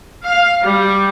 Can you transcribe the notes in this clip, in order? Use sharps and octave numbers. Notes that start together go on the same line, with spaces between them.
F5
G3